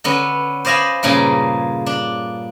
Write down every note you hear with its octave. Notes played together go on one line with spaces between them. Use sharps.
D3 B3 C#4
C5 D5 D#5 F5 G#5 B5
G2 A#2 C#3 A#3 G#4
D4